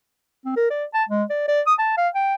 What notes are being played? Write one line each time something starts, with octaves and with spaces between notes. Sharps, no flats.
C4
A#4
D5
A5
G#3
D5
D5
D#6
A5
F5
G5